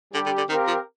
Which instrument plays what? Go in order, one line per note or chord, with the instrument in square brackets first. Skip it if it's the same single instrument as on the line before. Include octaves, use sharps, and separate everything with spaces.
[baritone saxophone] D3 [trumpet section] G3 D4 G4
[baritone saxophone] D3
D3
[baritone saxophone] D#3 [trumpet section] C4 G4 A#4 F5
[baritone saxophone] F3